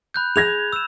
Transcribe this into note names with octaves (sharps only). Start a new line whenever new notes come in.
B5 F#6 G6
G#4 G#6 A#6 F7
E6 E7